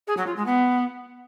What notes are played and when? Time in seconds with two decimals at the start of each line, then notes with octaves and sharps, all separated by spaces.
0.07 G#4
0.17 F#3
0.26 F4
0.36 G#3
0.45 B3